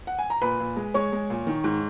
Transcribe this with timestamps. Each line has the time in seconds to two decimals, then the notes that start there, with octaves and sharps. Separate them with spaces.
0.07 F#5
0.18 G#5
0.30 A#5
0.42 A#2 B4 B5
0.60 A#2
0.76 G#3
0.94 G#3 C#5 C#6
1.12 G#3
1.30 A#2
1.47 D#3
1.64 G#2